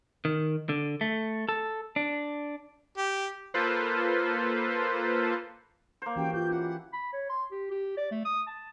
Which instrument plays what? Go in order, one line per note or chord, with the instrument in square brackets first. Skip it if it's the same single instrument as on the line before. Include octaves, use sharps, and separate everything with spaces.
[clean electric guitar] D#3
D3
A3
A4
D4
[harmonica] G4
[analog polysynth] A#3 F4 A4 B4 C5
[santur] A#3 C5
[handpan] E3 F#4 G4 [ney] C#4 [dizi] G5
[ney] F4 [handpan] G4 [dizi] G6
[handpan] C#4 E4 [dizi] F#5
[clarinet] B5
C#5
C6
G4
G4
D5
A3
D#6
A5